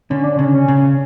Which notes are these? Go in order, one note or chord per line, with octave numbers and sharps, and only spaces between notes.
D3 C#4
D4
C#3 C#4
C#4
C#3